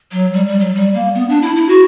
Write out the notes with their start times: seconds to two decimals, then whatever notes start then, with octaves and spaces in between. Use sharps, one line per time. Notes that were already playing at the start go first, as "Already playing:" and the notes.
0.12 F#3
0.33 G3
0.47 G3
0.60 F#3
0.74 G3
0.94 A#3
1.15 B3
1.29 D4
1.42 E4
1.56 E4
1.68 F#4